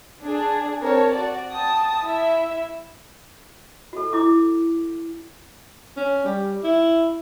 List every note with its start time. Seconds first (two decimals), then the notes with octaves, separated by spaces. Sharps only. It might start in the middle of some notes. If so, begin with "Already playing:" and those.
0.23 D4 G#4
0.82 C4 A#4 C#5 A5
1.14 F#4 D5
1.50 G5 A5 D#6
2.02 E4 E5
3.93 F#4 A4
4.13 E4 D6
5.97 C#4
6.25 G3
6.64 E4